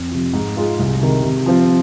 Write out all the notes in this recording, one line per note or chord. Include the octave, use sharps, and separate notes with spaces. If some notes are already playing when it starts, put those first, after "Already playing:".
Already playing: F2
C3 F3
G#2
G#3 F4 G#4
C2
C3 D#3 G#3
C3
F3 C4 F4